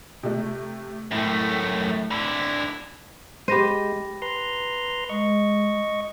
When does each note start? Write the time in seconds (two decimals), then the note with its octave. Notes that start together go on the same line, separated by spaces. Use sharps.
0.23 C3 A3
1.12 F#2 A2 A3 G5
2.11 D3 E4 B5
3.48 G#3 G4 C5 B5 A#6 D#7
4.22 B4 A#5 C6
5.09 G#3 D#5 C#6